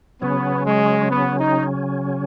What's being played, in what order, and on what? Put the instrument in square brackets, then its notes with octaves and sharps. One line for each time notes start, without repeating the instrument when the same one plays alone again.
[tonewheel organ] C#3 F#3 C#4 [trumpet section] B3
[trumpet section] G#3
B3
D#4